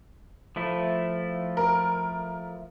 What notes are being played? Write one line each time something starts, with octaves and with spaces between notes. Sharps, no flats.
F3 A3 E4
A#4